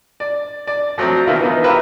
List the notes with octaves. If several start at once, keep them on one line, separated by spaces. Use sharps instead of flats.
D5
D5
F3 F#3 A3 C4
B2 D#3 A#3 E4 F4
E3 B3 D#4 F4
E4 F4 G4 A#4 B4 E5